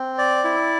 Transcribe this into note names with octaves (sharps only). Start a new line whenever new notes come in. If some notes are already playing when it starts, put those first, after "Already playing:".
Already playing: C4
D5
E4